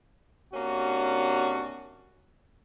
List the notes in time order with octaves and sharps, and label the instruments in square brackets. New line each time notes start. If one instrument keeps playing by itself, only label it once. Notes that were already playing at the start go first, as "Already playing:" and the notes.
[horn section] C3 A#3 C#4 D4 F#4